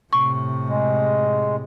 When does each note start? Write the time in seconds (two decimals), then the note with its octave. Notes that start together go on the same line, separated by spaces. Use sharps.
0.13 A2 C3 C#6
0.69 G#3